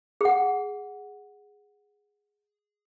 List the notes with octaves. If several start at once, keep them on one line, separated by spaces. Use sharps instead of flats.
G#4 F#5